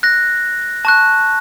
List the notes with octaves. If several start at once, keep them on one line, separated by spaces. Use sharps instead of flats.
F#6 A#6
A5 C#6 F#6